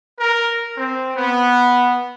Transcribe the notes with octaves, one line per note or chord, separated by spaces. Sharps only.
A#4
C4
B3